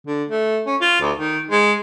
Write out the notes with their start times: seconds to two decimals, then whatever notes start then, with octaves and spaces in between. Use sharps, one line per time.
0.07 D3
0.29 A3
0.66 C#4
0.81 F4
1.01 D2
1.16 D#3
1.51 G#3